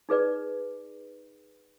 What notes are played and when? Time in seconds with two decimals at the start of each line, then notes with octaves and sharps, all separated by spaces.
0.09 D#4 G#4 B4 D5